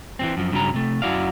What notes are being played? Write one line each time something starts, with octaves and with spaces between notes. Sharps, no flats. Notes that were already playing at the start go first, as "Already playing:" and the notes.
E3 F#3 C4
F#2 F3
G2 C#3 F#3 C#4 A#5
C3 A3
F#2 E4 F#4 D5 F5